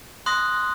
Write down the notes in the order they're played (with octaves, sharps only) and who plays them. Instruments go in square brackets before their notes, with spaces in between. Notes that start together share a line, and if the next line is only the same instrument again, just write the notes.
[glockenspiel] C6 D#6 F#6 A#6